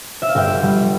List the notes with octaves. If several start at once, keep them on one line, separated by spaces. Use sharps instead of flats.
E5
F5
G1 E5 G5
G3